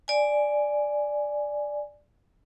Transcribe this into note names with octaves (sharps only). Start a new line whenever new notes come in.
D5 G#5